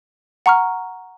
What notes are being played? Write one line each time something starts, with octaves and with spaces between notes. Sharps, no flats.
F#5 A#5 C#6 F6